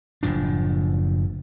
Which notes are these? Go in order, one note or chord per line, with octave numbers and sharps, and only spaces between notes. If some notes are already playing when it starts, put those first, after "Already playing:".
F#1 A2 F3 D4